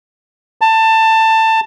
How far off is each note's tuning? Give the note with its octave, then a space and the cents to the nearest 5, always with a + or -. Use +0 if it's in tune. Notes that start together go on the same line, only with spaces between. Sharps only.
A5 +20